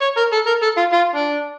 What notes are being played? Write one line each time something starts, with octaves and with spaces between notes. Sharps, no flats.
C#5
A#4
A4
A#4
A4
F4
F4
D4